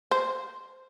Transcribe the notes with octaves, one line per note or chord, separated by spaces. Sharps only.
C5